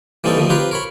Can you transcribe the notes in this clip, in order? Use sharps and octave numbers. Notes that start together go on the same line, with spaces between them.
E3 G3 A#3 C4 D#4 A4
D3 D#3 F3 A3
C4 F4 G4 B4 A#5
A#4 C#5 B5